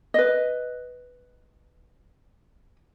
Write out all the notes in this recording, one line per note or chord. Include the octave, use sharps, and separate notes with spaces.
B4 D#5